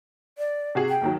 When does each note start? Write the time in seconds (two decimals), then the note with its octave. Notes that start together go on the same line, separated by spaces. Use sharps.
0.38 D5
0.75 C3 F#4 G#4
0.89 G5
1.01 D#2 D#3 F#3